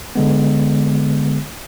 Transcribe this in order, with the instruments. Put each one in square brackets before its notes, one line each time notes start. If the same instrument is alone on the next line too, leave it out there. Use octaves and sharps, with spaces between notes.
[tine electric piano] D3 G#3 B3